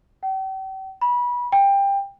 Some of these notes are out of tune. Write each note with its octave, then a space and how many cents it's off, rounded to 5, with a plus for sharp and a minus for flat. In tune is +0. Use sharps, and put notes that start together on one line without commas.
G5 -40
B5 -25
G5 +20